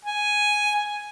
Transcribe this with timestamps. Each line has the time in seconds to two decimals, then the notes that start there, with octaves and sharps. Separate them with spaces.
0.05 G#5